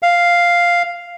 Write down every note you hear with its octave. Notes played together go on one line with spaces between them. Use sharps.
F5